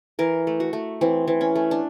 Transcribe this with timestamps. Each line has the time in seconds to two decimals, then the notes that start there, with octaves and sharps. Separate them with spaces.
0.19 E3 A#4
0.47 A3
0.60 F#4
0.73 A3
1.01 E3 C4
1.27 E3
1.41 C#4
1.56 A3
1.71 D4